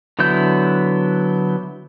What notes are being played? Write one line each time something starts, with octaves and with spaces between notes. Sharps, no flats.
D3 F#3 B3 E4 G6